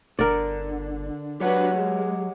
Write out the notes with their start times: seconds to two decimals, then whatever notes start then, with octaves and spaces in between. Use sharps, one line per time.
0.19 G1 D3 D4 A#4 D5
1.40 F#3 D4 F#4 G4 B4 C#5 F#5
1.74 G#3